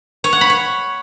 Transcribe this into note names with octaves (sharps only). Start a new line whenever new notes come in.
C#5
F#5
B5
C#5